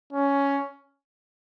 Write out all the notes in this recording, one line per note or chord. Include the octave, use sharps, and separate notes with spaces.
C#4